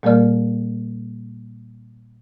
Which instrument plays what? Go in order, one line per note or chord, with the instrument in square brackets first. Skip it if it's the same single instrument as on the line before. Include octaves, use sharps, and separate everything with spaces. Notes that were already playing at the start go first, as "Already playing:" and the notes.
[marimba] A#2 G3 A#3 A#4 D5 F6